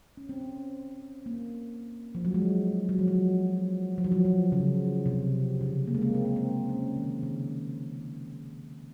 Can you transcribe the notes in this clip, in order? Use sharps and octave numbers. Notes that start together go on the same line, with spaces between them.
C#4
C4
C#4
A#3
F3
F#3
G#3
F#3
F3
F#3
F3
F#3
F3
F3
C#3
C3
C#3
A#3
G#3
A#3
C4
A#3
C4
C#4
D#3
C#3